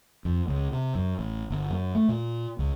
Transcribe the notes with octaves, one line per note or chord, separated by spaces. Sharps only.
F2
C#2
C3
F#2
A1
G1
F#2
A3
A#2
C#2